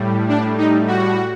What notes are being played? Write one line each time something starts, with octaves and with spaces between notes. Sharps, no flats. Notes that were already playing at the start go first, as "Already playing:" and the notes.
Already playing: A2 G3
D4
D#4
F#4